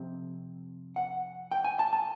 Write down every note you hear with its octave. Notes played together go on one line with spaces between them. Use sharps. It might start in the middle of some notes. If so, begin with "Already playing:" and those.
Already playing: F2 C3
F#5
G5
G#5
A5
A5